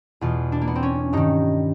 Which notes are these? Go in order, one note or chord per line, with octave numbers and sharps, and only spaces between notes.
E2 B2 F4
D4
A#3
B3
C4
C#4
G2 D#3 D#4